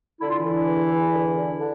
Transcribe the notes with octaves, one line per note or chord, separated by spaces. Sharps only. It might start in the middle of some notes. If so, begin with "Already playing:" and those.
D3 E4
F4
E3 E4
D3
E2
E2
D3
D3
D3